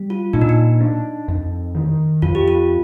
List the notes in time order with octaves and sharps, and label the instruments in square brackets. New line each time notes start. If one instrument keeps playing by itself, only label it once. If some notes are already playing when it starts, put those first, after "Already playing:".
Already playing: [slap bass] G3
[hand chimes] F4
[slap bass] A#2 [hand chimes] D#4
[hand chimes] D4
D#4
[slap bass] D4
F2
D#3
[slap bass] F2 [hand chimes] F4
[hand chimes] G4
F4